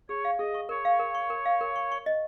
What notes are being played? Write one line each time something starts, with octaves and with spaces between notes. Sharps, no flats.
G#4 C#5
F5
G#4 D#5
C#6
A#4 C#5
F5
A#4
C#6
A#4
F5
A#4
C#6
C#6
D#5